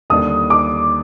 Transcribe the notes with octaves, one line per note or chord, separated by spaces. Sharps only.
D#2 D3 G3 D4 D#6
D6